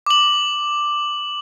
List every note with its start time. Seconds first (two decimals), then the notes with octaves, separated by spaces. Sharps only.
0.06 D6 F#7